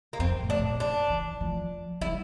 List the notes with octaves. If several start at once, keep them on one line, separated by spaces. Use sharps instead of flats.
A#3
F2 C4
A2
D4
A#2
D4
E3
F3
G3 E4